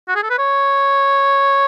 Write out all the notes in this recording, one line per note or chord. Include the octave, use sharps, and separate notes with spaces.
F#4
G#4
A4
B4
C#5